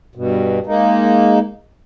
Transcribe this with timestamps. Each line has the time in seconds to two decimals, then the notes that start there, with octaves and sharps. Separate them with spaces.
0.15 G2 B2
0.66 G#3 A#3 D#4